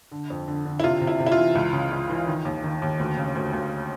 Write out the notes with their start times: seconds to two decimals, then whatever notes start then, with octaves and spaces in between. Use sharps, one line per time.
0.12 D3
0.30 F2
0.48 D3
0.65 D3
0.80 E4
0.83 C3 F4
1.01 C3
1.07 E4
1.20 C3
1.27 E4
1.32 F4
1.37 E3
1.55 C#2
1.73 C#3
1.92 C#2
2.10 E3
2.27 D#3
2.45 D#2
2.64 D#3
2.82 D#2
2.99 D2
3.17 C#3
3.35 D2
3.53 D2